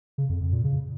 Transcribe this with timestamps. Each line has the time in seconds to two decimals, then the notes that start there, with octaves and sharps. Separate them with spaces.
0.18 C#3
0.30 F2
0.41 F2
0.53 A#2
0.64 C#3